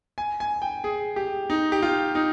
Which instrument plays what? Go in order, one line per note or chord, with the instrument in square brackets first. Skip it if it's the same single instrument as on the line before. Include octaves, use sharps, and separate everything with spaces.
[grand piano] G#5
G#5
G5
G#4
G4
D#4
G4
F4
D#4